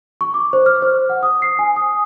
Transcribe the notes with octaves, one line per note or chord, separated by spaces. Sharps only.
C#6
D6
C5
F6
C5
F#5
D#6
C7
G#5
D#6